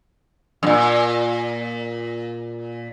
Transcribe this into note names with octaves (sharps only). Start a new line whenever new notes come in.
F#2 A#2